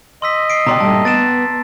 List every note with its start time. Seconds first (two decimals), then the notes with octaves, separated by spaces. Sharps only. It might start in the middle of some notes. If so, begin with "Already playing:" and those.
0.22 D#5 C6 E6 B6
0.50 C7 D7
0.67 B2 D5 G5 A#5 C6 D6
0.80 G2 A#2 A3 A5
1.05 B3 A6 D7 E7